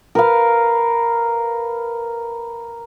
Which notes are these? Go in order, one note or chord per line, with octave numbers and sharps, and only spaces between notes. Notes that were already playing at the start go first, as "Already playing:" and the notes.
A#4 B4 F5